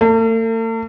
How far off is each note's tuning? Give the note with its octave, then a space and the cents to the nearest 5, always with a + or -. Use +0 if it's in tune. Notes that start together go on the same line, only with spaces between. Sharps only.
A3 +45